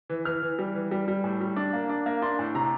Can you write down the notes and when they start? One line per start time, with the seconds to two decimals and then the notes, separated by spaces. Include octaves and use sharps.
0.10 E3
0.25 E3 F6
0.42 E3
0.59 G3
0.75 E3
0.91 G3
1.08 G3
1.24 A2
1.40 G3
1.56 D4
1.73 A#3
1.89 D4
2.06 A#3
2.22 D4 C6
2.39 A2
2.55 C3 A#5